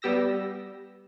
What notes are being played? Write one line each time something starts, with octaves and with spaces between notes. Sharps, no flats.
G3 B3 G4 E6 A#6